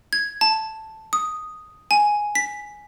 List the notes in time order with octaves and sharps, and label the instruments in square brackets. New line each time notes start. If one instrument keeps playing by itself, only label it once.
[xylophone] G#6
A5
D#6
G#5
B6